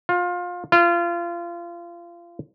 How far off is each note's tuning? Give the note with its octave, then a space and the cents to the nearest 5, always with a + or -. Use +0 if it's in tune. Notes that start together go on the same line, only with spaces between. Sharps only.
F4 +25
F4 -25